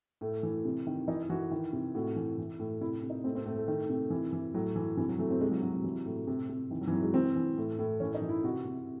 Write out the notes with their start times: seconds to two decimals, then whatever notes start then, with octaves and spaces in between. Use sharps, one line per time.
0.21 A2 A3
0.43 E3
0.65 C3
0.87 D#3
1.08 E3 D#4
1.29 E3 F#4
1.51 D#3
1.73 C3
1.94 A2 F#4
2.16 E3
2.38 E3
2.59 A2
2.81 C3 E4
3.03 C3
3.10 D#4
3.24 A2 C4
3.35 C4
3.46 A2 A3
3.57 A3
3.68 D#3
3.90 C3
4.10 E3
4.33 E3
4.54 A2 F#3
4.76 E3
4.97 C3 E3
5.09 F#3
5.19 E3 A3
5.30 C4
5.41 C3 G#3
5.51 F#3
5.62 C3 F#3
5.73 F#3
5.84 E3 F#3
6.06 A2
6.27 C3
6.49 C3
6.71 D#3 E3
6.81 F#3
6.87 E3
6.92 C3 F#3
7.03 G#3
7.14 E3 C4
7.36 E3
7.58 A2
7.79 A2
8.00 E3 C#4
8.15 D#4
8.22 E3
8.29 E4
8.44 C3 F#4
8.65 C3